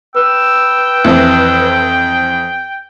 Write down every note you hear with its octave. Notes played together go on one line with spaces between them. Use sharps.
B4 G5 E6
F2 E3 C4